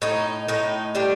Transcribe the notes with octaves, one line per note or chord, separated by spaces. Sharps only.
A2 D#4
A2 D#4
G3 D4